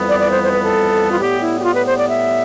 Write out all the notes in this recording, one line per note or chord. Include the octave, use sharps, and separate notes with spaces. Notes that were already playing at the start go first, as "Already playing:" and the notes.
Already playing: F2 E3 G3 B3
D5
D5
C5
C5
B4
A4
F4
A2 G3 B3 G4
E4
G4
F4
B4
C5
D5
E5